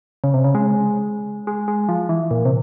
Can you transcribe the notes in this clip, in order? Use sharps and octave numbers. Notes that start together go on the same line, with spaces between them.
C#3
C3
C#3
G#3
G#3
G#3
F3
E3
A#2
C3